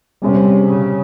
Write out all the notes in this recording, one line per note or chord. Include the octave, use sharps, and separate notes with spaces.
C3 G3 C#4 G#4 C#5
C#3